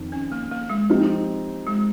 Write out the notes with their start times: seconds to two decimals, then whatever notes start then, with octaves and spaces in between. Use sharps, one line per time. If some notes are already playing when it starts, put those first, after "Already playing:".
Already playing: F2 D#3 C4
0.12 C#4
0.32 A#3
0.51 A#3
0.70 G#3
0.89 F3 A#3 C4 D#4 G4
1.67 G#3